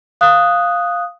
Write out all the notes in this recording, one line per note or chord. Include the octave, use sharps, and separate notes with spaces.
F5 D#6 F#6